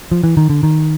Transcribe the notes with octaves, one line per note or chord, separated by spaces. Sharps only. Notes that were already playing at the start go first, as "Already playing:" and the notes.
F3
E3
D#3
D3
D#3